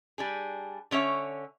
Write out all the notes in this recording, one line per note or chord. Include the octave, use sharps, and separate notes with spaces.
G3 D4 G#4
D3 C#4 C#5 E5